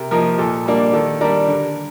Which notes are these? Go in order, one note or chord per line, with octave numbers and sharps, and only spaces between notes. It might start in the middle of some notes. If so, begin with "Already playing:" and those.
Already playing: C3 A#4
F3 A#3 D#4 A#4
A#2 A4
G3 A#3 D4
D#3 A4
G3 D4 A#4
D3